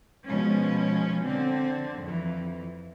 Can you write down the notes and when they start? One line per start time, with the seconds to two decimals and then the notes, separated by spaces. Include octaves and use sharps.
0.27 B2 F3 G#3 C#4
1.26 D3 C4
2.02 F2 E3